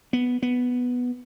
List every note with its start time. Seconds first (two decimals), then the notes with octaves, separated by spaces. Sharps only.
0.13 B3
0.42 B3